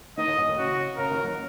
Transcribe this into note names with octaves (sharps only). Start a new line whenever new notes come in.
D#3 D#4 D#5
D#2 D#3
F#2 F#3
D#2 D#3
C#3 F#4
C#3 A#4
D#2 D#3
F#3 F#4